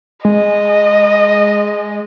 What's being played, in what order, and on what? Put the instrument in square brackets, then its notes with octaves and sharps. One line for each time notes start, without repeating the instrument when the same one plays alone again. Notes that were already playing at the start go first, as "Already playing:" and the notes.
[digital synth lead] G#3 [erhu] D#5